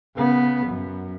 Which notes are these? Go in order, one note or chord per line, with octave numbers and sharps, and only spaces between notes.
C#3 B3
F#2